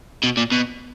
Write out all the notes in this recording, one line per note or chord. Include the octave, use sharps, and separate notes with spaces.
B2
A#2
B2